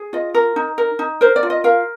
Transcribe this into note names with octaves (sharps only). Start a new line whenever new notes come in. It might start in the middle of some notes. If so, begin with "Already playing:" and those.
Already playing: G#4
F4 D#5
A#4
D#4
A#4
D#4
A#4 C5
D5
F4
D#5
A#4 F5